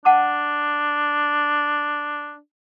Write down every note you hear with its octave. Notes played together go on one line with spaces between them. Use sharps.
D4 F#5 A5 D6